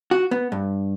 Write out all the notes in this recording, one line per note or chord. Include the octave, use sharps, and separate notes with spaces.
F#4
B3
G2